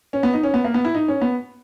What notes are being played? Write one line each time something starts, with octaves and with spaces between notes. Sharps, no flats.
C#4
B3
D#4
C#4
B3
A#3
B3
E4
D#4
C#4
B3